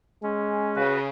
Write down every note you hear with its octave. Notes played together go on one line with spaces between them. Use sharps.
G#3 C#4
C#3 F#4 B4